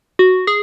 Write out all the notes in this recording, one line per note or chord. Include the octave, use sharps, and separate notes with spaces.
F#4
G#4